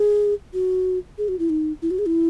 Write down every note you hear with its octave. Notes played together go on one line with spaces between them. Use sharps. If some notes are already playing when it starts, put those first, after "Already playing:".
Already playing: G#4
F#4
G#4
F#4
E4
D#4
E4
F#4
G#4
E4